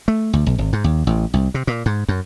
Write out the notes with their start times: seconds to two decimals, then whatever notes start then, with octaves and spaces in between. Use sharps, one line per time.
0.08 A3
0.33 D2
0.46 B1
0.58 G#1
0.73 G#2
0.84 D#2
1.07 A1
1.34 C2
1.54 C3
1.67 A#2
1.86 G#2
2.08 F#2